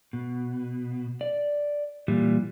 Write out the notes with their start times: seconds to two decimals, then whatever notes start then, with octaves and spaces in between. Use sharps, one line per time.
0.13 B2
1.21 D5
2.08 A#2 E3 G3